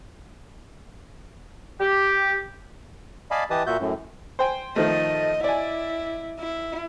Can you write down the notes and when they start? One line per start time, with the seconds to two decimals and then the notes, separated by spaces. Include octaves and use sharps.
1.80 G4
3.31 D5 D#5 F5 G#5 A5 B5
3.50 E3 G4 B4 D#5 A5 D#6
3.67 A#2 F#4 E5 G6
3.80 F#2 A2
4.39 C5 G5 G#5
4.76 D#3 F3 A3 D#5
5.44 E4 D5 G#5
6.39 E4